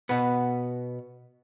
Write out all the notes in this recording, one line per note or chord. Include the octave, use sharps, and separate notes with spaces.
B2 B3